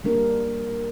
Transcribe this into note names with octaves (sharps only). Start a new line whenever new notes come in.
G3 A#3 D4 A#4